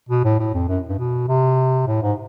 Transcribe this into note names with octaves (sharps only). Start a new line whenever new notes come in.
B2
A2
A2
F2
F#2
G2
B2
C3
A2
G#2